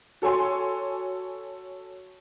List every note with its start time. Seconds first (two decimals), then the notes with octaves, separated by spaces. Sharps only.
0.22 F#4 A4 C#5 G#5 C6